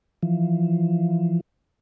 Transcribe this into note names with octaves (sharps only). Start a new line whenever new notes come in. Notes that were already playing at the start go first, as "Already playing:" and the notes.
E3 F3